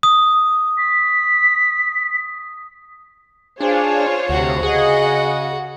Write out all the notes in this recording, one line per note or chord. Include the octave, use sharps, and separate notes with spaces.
D#6
B6
D4 F4 G#4 C5 C#5
D2 C3 F#4
C#3 G#4 D#5 F#5